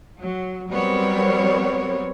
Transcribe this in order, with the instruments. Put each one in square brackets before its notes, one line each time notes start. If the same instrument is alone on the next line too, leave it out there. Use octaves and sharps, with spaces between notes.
[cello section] F#3
F#3 G3 B3 C4 A#4 C#5